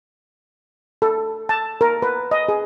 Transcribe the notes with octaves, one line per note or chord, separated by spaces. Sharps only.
A4
A5
A#4
B4
D#5
G#4